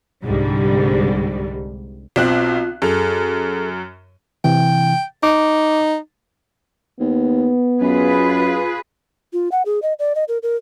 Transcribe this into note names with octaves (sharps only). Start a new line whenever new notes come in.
C2 G#2 D3 G3
B1 C4 F4 F#6
F#2 G#4 A4
C3 E3 G5
D#4 D6
D#2 B3
F#2 F4 G#4 B4
F4
F#5
G#4
D#5
D5
D#5
A#4
A#4